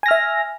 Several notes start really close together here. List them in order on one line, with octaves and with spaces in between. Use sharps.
G#5 A#6 F6 E5